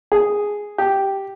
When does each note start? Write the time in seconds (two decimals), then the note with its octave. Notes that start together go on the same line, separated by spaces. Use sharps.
0.12 G#4
0.78 G4